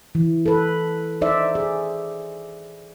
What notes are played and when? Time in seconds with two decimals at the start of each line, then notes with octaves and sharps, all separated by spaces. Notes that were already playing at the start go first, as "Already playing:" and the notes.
0.15 E3
0.46 A4 B4
1.21 D#4 C5 D5 E5
1.55 G#4